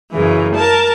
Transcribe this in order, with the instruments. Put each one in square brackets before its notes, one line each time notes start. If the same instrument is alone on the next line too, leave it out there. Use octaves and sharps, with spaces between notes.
[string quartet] F#2 C#3 E3
A#4 A5